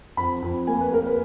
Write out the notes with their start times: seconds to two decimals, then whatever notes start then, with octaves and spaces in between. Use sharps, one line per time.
0.17 F2 B5
0.42 F2
0.67 A#3 G#5
0.81 B4
0.92 A#3 A#4
1.06 B4